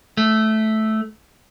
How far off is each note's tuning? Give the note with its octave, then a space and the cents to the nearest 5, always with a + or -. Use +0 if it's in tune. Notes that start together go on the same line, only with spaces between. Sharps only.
A3 -10